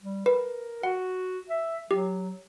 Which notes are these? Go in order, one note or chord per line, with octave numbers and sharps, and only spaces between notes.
G3
A#4 B4
F#4 F#5
E5
F#3 G4